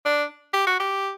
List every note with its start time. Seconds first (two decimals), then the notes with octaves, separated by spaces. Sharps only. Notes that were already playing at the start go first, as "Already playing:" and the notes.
0.06 D4
0.54 G4
0.67 F#4
0.80 G4